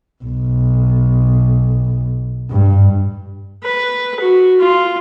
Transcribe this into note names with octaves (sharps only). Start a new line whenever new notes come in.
B1
G2
B4
F#4
F4